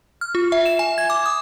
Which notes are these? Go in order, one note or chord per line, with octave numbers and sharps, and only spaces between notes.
F6
F4
E5
E7
G#5
G#6
D6
D#6